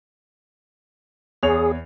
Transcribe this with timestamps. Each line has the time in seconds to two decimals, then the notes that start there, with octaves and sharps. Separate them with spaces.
1.43 E2 G#4 C#5 F7